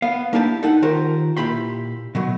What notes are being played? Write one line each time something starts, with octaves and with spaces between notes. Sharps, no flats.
B3 F5
A#3 D4 E4 G4 G#5 A5
D#4 A4 F#5
D#3 F4 G4 A#4 C5
A#2 E4 G4 B5 C6
B2 F#3 A3